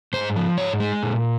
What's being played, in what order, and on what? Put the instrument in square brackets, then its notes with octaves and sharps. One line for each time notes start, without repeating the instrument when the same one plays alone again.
[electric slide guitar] G#2 C5
F3
G#2 C#5
G#3
A#2